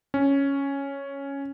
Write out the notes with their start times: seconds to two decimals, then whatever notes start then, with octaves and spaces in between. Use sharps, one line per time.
0.14 C#4